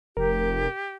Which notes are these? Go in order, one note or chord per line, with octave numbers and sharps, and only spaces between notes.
F1 G4 A#4